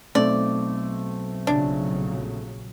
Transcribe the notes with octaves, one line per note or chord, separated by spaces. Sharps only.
B1 A3 C4 D5
A#1 C#3 F#3 D4